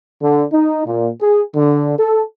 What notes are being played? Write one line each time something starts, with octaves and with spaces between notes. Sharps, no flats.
D3
D#4
A#2
G#4
D3
A4